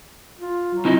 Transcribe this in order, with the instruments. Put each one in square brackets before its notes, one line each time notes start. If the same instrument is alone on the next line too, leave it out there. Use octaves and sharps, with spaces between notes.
[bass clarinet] F4
F#3
[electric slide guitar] C3 E4 D#5